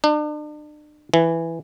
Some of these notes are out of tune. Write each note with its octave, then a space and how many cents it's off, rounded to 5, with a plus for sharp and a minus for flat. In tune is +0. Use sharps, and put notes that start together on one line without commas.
D4 +40
E3 +5